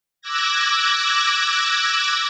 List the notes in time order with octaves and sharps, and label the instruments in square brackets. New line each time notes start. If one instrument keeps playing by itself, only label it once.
[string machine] D6 E6 F#6 G#6 A#6